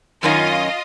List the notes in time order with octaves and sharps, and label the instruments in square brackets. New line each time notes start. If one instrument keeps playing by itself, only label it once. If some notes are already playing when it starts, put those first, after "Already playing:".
[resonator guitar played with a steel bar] F#2 D#3 C#4 [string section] F4 D#5